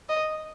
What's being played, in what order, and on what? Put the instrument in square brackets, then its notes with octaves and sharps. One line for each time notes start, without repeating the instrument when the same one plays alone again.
[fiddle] D#5